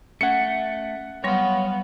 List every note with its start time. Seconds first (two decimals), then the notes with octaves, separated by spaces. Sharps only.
0.21 A3 C#4 F#5 G#6 C#7
1.24 F#3 G3 B3 C#5 F5 C6